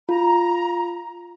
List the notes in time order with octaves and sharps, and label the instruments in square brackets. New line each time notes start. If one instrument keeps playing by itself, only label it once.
[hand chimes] F4 [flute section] A#5